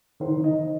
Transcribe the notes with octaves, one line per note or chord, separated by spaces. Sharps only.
D#3 C5
D#3
D#5